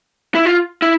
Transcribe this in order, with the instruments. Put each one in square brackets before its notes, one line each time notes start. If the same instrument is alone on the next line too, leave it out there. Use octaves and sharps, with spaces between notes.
[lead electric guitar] E4
F4
E4